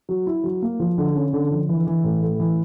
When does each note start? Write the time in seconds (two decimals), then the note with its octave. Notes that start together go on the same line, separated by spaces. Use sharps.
0.09 F#3
0.27 E4
0.44 F#3
0.62 A#3
0.80 F3
0.98 D3
1.15 C#4
1.33 D3
1.51 F3
1.69 E3
1.87 E3
2.04 A2
2.22 A3
2.40 E3